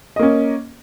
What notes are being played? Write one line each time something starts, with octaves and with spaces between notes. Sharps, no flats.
A#3 C#4 D#5